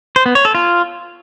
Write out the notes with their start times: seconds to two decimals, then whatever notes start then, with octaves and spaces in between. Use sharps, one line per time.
0.16 C5
0.26 B3
0.35 C#5
0.45 A4
0.55 F4